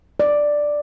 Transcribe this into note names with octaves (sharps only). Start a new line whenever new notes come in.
D5